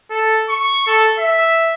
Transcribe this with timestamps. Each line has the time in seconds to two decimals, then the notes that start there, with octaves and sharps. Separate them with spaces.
0.10 A4
0.49 C#6
0.87 A4
1.19 E5